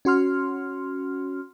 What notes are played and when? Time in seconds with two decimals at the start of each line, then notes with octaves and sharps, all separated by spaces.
0.05 C#4 F#4 C6 F6